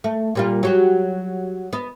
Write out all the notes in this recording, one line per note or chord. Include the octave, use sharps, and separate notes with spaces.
A3
A#2 G3 F4
F#3 F#4 G4
B3 D#5